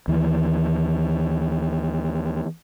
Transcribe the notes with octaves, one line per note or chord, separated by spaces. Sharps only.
D#2 E3